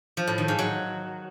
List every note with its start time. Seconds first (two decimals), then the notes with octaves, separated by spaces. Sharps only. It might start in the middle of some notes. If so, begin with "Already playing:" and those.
0.17 F3
0.27 A2
0.38 D#3
0.48 G#2
0.59 F#3